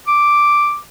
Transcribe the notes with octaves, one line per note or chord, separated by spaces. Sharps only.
D6